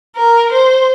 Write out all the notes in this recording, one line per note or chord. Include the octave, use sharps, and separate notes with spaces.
A#4
C5